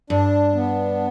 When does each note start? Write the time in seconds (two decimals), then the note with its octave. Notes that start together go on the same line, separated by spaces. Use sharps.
0.10 G2 D4
0.55 B3